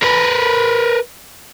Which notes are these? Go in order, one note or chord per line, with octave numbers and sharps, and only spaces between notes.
A#4 B4